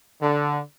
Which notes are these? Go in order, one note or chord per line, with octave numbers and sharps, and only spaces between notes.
D3